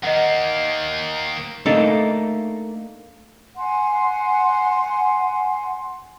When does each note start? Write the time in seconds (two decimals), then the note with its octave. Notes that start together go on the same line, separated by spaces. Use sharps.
0.03 D#3 A#3 D#5 F#5
1.66 A3 A#3 D4 D#4 A4
3.57 F#5 G#5 C6